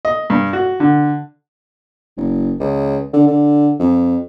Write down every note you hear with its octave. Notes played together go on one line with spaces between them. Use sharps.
D#5
G2
F#4
D3
F#1
C#2
D3
D3
F2